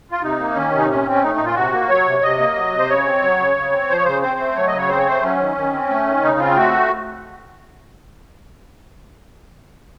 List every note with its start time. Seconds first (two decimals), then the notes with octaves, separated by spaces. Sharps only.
0.11 F4
0.22 C3 D#4
0.39 A#3
0.55 D#3 C#4
0.72 C3
0.78 D#4
0.89 A#2 C#4
1.06 C4 C#4
1.22 A3 D#4
1.35 A#2 D#4
1.45 F4
1.56 C3 F#4
1.72 A#3
1.89 F#3 C#5
2.06 C3
2.23 C3 D#5
2.39 A#3
2.56 F#3
2.73 C3
2.79 C5
2.89 C#3 C#5
3.06 C4
3.22 F#3
3.39 C#3
3.57 C#3
3.72 C4
3.89 F3 C5
3.97 C#5
4.05 C#3 C5
4.22 C4 C5
4.39 A3
4.56 F#3 C#5
4.67 D#5
4.72 C#3
4.77 C#5
4.90 C4 C5
4.98 C#5
5.06 A3 C5
5.23 F#3 C#4
5.39 D#3
5.57 D#3
5.73 C4
5.90 A3
6.07 D#3
6.23 C#3 D#4
6.39 C4 F4
6.57 A3 F#4